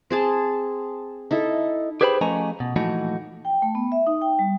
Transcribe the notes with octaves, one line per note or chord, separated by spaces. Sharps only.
C4 G#4 A5
D#4 E4 A4
G4 G#4 B4 C5 G5 B5
F3 A3 C#4 D#5 G#5 A#5
B2
A#2 E3 F3 A3 D#4 F#4
G5
A3
B3
E5
D#4
G5
G3